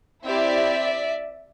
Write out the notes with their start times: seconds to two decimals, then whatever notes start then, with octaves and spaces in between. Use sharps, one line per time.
0.24 C4 E4 G4 D5 E5